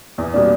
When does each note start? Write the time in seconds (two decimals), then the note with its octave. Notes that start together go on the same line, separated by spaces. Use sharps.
0.18 E2
0.34 B2 G3 A#3 D4